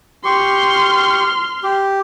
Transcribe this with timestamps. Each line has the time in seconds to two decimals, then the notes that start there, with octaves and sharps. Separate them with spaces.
0.25 G4 C6 C#6 F6
1.63 G4